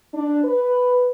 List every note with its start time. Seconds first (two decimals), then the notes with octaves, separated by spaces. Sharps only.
0.14 D4
0.44 B4